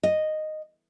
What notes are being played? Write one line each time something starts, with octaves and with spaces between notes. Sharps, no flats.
D#5